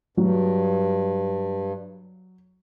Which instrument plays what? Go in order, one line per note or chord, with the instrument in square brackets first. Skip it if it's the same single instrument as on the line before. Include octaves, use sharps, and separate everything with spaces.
[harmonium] G2 [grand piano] F#3